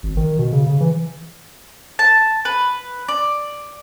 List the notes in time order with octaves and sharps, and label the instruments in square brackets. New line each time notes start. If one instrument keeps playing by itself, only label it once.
[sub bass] G#1
D#3
B2
C#3
C#3
E3
[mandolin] A5
B4
D5